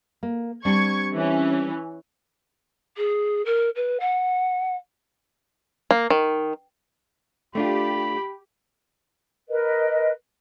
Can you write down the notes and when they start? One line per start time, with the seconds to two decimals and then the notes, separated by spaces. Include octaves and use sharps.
0.23 A#3
0.65 G3 C4 D4 C#6 G#6
1.12 E3 C#4
2.96 G#4
3.45 A#4
3.75 B4
4.00 F#5
5.91 A#3
6.10 D#3
7.55 A3 D4 F4 G4 B5
9.48 A#4 B4 D#5